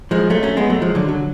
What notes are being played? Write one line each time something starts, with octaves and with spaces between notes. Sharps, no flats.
F3 G#3
F#3 A3
A3 C#4
G#3 B3
F#3 A3
F3 G#3
D3 F#3
D3 F#3